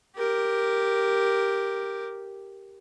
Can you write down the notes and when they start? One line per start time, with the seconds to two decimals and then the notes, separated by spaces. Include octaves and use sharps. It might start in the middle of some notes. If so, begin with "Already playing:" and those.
0.16 G4 A#4